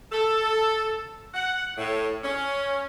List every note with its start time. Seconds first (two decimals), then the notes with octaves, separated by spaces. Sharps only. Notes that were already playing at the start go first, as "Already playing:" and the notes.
0.12 A4
1.34 F#5
1.78 A2
2.24 C#4